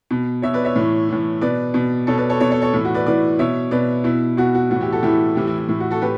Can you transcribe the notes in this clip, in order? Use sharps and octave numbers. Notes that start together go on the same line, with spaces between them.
B2
B2 C#5 E5
B4 D5
C#5 E5
A2 E3
A2 E3
B2 B4 D5
B2
B2 A4 C#5
B4 D5
A4 C#5
B2 A4 C#5
A4 C#5
A4 C#5
A2 E3 E4
F#4
B4 D5
A2 E3 B4 D5
B2 C#5 E5
B2 B4 D5
B2 E4
B2 F#4
F#4
A2 E3 F#4
E4 G4
F#4 A4
A2 E3 E4 G4
A2 E3 E4 G4
E4
E4
A2 E3 E4
F#4
F#4 A4
A2 G4 B4